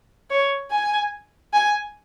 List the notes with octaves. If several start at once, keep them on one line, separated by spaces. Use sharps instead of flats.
C#5
G#5
G#5